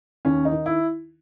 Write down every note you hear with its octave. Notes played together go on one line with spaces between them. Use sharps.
D#2 C#4
D#4
D#3
E4